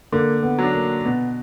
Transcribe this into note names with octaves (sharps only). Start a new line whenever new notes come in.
D3 A#3
B3
F#3 D4
A#3
B2 B3